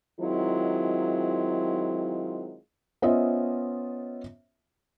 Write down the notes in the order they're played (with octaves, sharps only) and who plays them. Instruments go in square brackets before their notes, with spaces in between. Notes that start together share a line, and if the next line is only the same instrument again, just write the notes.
[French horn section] D#3 F#3 G#3 C4 E4 F4
[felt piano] B3 C#4 F4 C5 D#5 E5